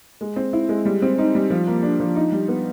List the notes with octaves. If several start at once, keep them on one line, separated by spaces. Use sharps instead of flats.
G#3
C4
E4
G#3
G3
C4
D#4
G3
F3
A#3
D4
F3
D#4
G3
B3